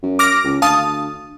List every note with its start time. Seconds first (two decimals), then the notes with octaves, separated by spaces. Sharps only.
0.03 F#2
0.19 D6 F6 A#6
0.45 C#2
0.62 D2 F5 A5 D#6